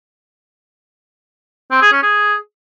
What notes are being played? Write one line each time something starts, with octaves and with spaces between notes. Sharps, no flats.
C4
G#4
C#4
G#4